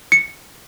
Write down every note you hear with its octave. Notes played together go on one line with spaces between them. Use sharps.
C#7